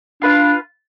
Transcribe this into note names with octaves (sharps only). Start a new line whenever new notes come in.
D4 F4 B4 F5